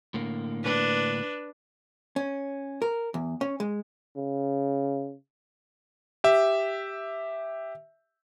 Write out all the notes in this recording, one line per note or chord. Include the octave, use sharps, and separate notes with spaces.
A2 D3 A#3
D4 B4
C#4
A#4
E2
C#4
G#3
C#3
G4 E5